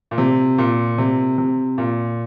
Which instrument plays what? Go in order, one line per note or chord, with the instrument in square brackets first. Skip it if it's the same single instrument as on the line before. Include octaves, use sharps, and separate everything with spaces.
[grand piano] A#2
C3
A#2
C3
C3
A#2